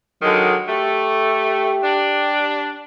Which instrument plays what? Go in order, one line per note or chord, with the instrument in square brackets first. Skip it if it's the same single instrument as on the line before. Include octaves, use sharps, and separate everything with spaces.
[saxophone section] D3 D#3 G#3 [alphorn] F#3
[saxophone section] A3 [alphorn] G4
[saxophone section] D4